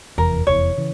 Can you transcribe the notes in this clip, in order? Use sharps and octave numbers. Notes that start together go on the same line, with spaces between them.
F1 E2 E3 A#4
F1 E2 E3 C#5
C#3 E3